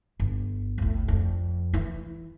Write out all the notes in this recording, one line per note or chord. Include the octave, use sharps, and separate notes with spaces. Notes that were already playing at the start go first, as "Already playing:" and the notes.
G1
D2 A2
F2 D4
E3 E4